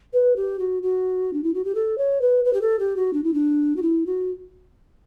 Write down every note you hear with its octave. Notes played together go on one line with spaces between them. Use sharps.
B4
G4
F#4
F#4
D4
E4
F#4
G4
A4
C#5
B4
B4
G4
A4
G4
F#4
D4
E4
D4
F#4
E4
F#4